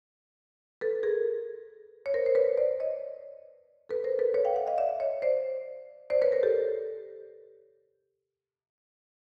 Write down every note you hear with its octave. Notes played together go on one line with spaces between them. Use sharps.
A4 B4
G#4 A#4
C#5
A#4 C5
C5
B4 C#5
C5 D5
C#5 D#5
A4 B4
A#4 C5
A4 B4
B4 C#5
F5 G5
E5 F#5
D#5 F5
D5 E5
C#5 D#5
C5 D5
C5 D5
B4 C#5
A#4 C5
G4 A4